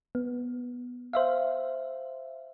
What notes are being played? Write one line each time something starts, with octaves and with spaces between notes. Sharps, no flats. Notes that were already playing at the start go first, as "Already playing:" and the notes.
B3
C5 E5 F5